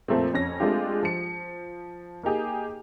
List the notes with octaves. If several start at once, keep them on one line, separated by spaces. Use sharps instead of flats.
F2 A#2 F3 A3 A#3 C4
F2 C#4 A#6
G#3 A3 C4 D4 F4 G4
F3 C#7
A#3 D#4 G4 G#4